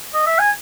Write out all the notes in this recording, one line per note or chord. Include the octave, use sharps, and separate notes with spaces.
D#5
E5
G#5